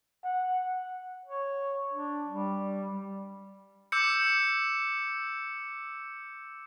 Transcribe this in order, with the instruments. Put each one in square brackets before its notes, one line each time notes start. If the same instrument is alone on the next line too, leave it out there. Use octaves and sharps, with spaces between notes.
[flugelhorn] F#5
[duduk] C#5
D4
G3
[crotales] D6 E6 G6 C#7